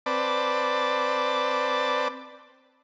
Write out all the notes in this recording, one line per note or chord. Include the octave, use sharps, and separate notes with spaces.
C4 B4 D5 A5